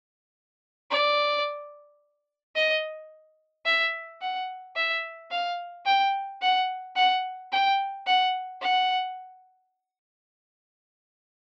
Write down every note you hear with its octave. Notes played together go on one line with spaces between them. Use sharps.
D5
D#5
E5
F#5
E5
F5
G5
F#5
F#5
G5
F#5
F#5